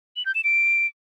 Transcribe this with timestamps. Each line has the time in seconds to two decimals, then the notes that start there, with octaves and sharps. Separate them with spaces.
0.16 F#7
0.25 G6
0.35 E7
0.44 D7